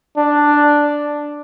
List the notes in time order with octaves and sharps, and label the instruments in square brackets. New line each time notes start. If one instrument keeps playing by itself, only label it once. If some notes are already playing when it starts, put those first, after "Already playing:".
[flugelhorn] D4